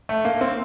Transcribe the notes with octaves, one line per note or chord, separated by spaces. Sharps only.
A3
A#3
C4